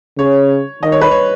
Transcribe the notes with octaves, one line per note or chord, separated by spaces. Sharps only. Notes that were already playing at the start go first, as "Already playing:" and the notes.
C#3 C#5
D#3 D#5
C#5
B4
C#5